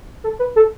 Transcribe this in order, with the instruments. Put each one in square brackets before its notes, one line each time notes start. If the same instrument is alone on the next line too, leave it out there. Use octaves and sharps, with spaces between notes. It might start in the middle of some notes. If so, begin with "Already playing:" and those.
[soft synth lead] A4
B4
A4